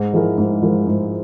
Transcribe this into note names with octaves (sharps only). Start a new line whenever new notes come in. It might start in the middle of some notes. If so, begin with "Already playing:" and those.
Already playing: G#2
F3 G#3 E4 A#4
G#2
F3 G#3 E4 A#4
G#2